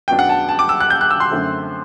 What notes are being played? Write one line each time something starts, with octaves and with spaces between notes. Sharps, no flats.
F#2 F#3 B3 D4 G5
F#5
A5
A5
D6
E6
F#6
G6
F#6
E6
C6
F#2 D3 A3 C4